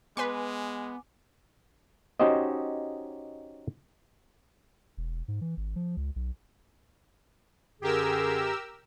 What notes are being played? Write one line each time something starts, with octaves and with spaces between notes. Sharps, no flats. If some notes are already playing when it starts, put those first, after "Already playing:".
G#3 B3 B4 G#5 C6 D6
C#4 D#4 F#4 G4 C5 D#5
E1
G#2
E3
G#1
F3
C#2
B1
F#2 D3 G4 G#4 A#4 E6